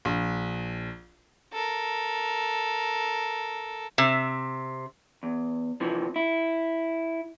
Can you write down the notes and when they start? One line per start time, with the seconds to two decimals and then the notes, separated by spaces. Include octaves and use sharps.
0.05 A#1
1.53 A4 A#4
3.98 C3
5.23 E2
5.80 C3 E3 F3
6.16 E4